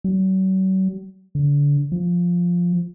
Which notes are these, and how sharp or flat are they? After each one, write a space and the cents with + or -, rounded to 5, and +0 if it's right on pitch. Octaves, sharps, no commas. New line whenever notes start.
F#3 +40
D3 -30
F3 +5